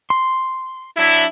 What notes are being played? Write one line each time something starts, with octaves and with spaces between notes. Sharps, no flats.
C6
F#3 D4 E4